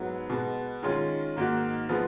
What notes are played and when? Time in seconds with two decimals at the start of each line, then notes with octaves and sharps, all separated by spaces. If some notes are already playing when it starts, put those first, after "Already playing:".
Already playing: G#2 F#3 B3
0.30 B2 G#3 B3
0.83 D#3 G#3 C#4 F4
1.36 G#2 D#3 A#3 D#4 F#4
1.89 F3 G#3 B3 F4